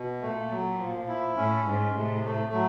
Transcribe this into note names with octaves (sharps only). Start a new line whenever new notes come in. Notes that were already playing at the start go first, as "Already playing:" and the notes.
Already playing: B2
A#2 A3
F#3
F3
E4
A2 C#4
G#2 G#3
A2 C3
A3
F#3